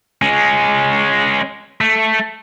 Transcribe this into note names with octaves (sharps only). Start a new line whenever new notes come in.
G#3 C#4
A3